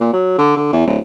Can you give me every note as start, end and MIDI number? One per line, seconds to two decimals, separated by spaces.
0.01 0.09 46
0.13 0.37 54
0.39 0.53 50
0.57 0.71 50
0.73 0.84 40
0.87 0.98 26